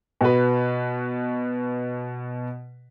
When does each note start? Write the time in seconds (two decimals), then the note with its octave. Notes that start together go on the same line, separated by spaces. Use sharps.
0.21 B2 F#4 B4